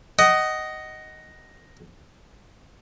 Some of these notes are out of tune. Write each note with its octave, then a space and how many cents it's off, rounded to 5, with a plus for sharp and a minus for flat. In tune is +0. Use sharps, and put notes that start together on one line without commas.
D#5 +0 F#5 +25